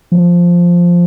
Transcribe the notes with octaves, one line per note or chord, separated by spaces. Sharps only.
F3